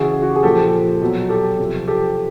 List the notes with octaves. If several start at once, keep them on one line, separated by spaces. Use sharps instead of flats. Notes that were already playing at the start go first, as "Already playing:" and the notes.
Already playing: C#3 E3 F#4 G#4
F#4
G4
G#4
A#2 F3 G4 A4
B2 F#3
G4 A4
C3 F3
G4 A4